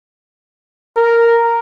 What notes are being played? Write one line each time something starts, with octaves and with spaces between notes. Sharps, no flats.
A#4